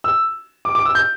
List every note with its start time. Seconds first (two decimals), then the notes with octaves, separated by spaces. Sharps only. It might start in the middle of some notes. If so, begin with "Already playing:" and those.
0.04 E6
0.65 D6
0.75 D6
0.85 E6
0.95 G6